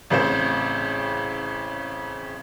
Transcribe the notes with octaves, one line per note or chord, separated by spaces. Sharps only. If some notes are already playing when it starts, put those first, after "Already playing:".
A1 C#3 C4 C5